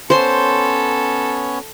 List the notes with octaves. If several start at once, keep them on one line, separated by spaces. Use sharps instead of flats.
B3 C#4 A4 C5 C#5 C6